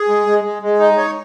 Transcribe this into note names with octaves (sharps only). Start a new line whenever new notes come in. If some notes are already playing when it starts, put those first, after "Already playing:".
Already playing: G#4
G#3
G#3
G#3
G#3
D#4
C#5